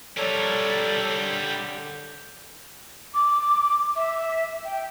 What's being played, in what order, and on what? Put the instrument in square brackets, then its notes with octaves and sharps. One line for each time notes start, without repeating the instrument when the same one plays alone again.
[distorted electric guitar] G3 A#4 [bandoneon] A4 C#5 D5
[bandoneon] D3
[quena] D6
E5
G5